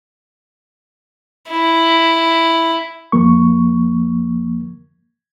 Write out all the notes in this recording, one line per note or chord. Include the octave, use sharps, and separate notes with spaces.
E4
F2 F3 A#3 C#6